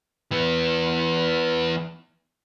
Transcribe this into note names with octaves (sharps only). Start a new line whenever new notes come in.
E3 B3